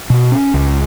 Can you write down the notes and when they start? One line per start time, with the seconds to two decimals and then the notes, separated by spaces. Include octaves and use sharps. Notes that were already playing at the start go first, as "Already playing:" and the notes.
0.10 B2
0.31 C#4
0.54 C#2